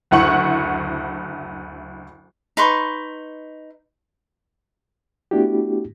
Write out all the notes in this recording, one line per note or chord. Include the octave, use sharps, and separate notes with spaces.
F#1 D2 E4 F#5 C#6 F#7
D#4 B4 C6 C#6
A3 B3 D4 E4 F#4 G4